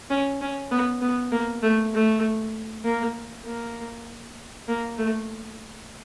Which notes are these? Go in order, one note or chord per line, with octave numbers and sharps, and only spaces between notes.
C#4
C#4
B3
B3
A#3
A3
A3
A#3
A#3
A#3
A3